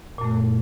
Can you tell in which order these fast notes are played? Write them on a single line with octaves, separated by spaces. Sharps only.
A#2 F#2 A3